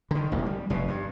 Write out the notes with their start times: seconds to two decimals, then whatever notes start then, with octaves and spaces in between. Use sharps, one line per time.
0.11 D3 D#3
0.31 E1 A1 D2
0.46 G3
0.70 F1 B2
0.88 G2